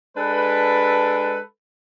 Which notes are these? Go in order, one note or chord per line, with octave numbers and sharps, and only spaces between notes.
G#3 D4 A4 B4